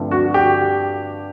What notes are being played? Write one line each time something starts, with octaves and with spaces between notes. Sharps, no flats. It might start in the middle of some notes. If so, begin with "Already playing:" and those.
Already playing: G2 D3 F3 A3 C4
F#4
G4